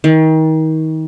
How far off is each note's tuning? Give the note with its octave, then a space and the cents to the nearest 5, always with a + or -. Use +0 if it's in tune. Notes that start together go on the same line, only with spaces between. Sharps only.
D#3 +30